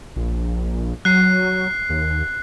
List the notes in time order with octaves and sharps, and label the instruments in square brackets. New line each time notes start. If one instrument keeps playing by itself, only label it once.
[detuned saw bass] A#1
[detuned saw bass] F#3 [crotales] F#6 C7
[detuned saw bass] D#2